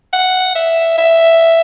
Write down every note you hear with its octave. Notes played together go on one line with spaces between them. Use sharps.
F#5
E5
E5